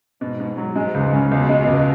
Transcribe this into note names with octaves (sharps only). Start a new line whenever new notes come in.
G#2 B2
B2
F#3
G#2 G#3
C#2
C#3
C#2 B2
G#3
C#2